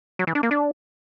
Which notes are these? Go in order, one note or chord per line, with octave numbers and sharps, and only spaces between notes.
F#3
E3
D4
A#3
D4